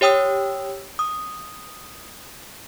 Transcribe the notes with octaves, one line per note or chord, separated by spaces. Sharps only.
G4 C#5 G5 D#6 E6
D#6